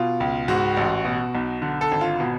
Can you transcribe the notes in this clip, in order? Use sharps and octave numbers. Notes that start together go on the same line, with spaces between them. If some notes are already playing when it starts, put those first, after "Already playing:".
Already playing: B2 F4
C#2
G#2 F#4
A1
B2
B1
D3
A4
G#1
F4
B2